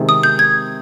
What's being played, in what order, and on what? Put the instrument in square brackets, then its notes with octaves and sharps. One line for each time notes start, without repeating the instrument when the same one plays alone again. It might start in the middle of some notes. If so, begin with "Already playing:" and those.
Already playing: [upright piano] C3 D#3 G#3
[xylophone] D#6
G6
G#6